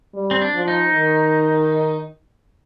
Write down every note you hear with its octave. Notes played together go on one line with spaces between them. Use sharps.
G3
C4
D4
F3
D#4
D#3